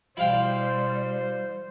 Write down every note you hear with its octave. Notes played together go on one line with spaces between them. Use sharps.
B2 G3 E4 C5 F5 G5